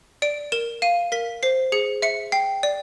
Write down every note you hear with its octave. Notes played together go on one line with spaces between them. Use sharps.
D5 D7
A#4 E7
F5 D#7
A#4 B6
C5 C7
G#4 C#7
E5 C#7
G5 C7
D5